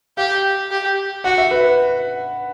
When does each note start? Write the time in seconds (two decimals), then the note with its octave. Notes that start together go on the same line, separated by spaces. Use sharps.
0.17 G4 F5
0.71 G4
1.24 F#4 F#5
1.38 E5
1.51 B4